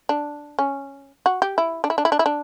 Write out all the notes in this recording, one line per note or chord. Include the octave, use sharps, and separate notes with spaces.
D4
C#4
F#4
G4
E4
D4
E4
D4
E4
D4
E4
D4